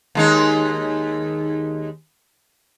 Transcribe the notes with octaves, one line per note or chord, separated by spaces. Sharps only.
D#2 G#3 D#4